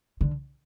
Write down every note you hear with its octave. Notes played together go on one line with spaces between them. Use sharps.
D3